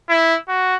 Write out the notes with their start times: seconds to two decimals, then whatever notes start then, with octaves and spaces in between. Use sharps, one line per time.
0.09 E4
0.49 F#4